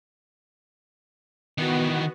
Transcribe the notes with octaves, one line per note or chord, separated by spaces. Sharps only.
D#3 E3 B3 F#4